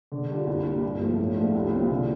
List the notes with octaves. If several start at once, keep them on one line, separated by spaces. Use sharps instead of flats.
D3
G3 D4 F4
C2
A#2 G3 D4
G2
F3 A3
A2
F3 A3 D4 F4
C2
A#2 G3 C4 F4
D3